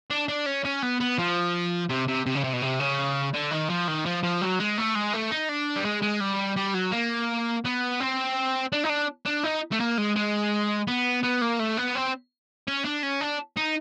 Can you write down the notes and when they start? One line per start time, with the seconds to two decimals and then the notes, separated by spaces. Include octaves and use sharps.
0.10 D4
0.28 D4
0.46 C#4
0.65 C#4
0.83 B3
1.00 B3
1.18 F3
1.90 C3
2.08 C3
2.26 C3
2.35 C#3
2.44 C3
2.53 B2
2.62 C3
2.80 C#3
3.34 D3
3.51 D#3
3.69 F3
3.88 D#3
4.05 F3
4.23 F3
4.41 F#3
4.59 G#3
4.78 A3
4.95 G#3
5.13 A3
5.31 D#4
5.49 D4
5.76 G3
5.85 G#3
6.02 G#3
6.21 G3
6.57 G3
6.75 F#3
6.92 A#3
7.65 B3
8.00 C4
8.72 D4
8.84 D#4
8.90 D4
9.26 D4
9.44 D#4
9.72 A3
9.80 A#3
9.97 G#3
10.16 G#3
10.87 B3
11.23 B3
11.41 A#3
11.59 A3
11.77 B3
11.95 C4
12.67 C#4
12.85 D4
13.03 C#4
13.21 D4
13.57 D#4